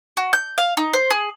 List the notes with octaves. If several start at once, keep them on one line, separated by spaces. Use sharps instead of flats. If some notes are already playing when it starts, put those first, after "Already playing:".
F#4
G6
F5
D#4
C5
G#4